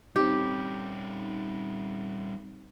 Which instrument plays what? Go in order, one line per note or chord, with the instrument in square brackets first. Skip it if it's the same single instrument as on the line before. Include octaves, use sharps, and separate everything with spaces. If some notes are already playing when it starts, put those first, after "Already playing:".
[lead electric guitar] G3 C#4 [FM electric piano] C4 D#4 [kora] G4